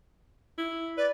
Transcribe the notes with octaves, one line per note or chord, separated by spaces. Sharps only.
E4
B4 D5